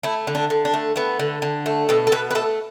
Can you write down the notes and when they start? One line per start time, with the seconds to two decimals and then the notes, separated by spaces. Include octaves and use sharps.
0.03 A3 E4
0.27 D3
0.35 D4
0.50 D3
0.65 D4
0.74 A3
0.96 A3 B3
1.19 D3
1.42 D3
1.66 A3
1.89 B2 A4
2.07 A4
2.12 B2 B4
2.31 B4
2.35 A3 A4